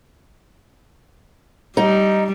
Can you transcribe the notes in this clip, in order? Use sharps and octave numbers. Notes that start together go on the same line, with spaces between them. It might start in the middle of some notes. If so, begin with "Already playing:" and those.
G3 D#4